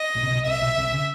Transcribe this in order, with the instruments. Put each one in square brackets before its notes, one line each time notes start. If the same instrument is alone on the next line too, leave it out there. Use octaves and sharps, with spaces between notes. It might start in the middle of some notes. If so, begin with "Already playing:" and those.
Already playing: [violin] D#5
[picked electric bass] A#1 A#2
C3
B1 B2
[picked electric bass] C2 C3 [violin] E5
[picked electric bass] B1 B2
C2 C3
C#3